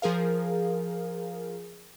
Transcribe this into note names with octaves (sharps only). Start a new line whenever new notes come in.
F3 G#4 A#4 F5